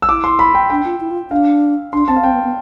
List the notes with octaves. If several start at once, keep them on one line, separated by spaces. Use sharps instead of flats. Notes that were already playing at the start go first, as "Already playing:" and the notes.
E6
E4 D6
C6
B5
G5
D4 G5
F4
E4
F4
D4 F5
D4 C6
C4 A5
F5
C4 G5
B3
B3